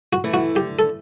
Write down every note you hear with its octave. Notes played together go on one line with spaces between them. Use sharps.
F#4
E3 A3 E4
F#4
D3 G4
A4